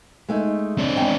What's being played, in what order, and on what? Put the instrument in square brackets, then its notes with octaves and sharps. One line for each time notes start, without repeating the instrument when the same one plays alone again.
[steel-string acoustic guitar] G#3 A3 D#4
[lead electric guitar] C4 D4
[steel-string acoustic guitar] E2 G#2 G5